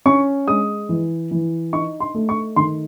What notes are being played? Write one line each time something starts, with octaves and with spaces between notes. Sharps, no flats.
C#4 C#6
G#3 D#6
E3
E3
D#4 C#6
C6
A3
C#6
D#3 C6